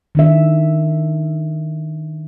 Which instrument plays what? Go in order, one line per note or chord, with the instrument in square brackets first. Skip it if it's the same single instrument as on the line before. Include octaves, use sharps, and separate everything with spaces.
[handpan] D#3 D4 E5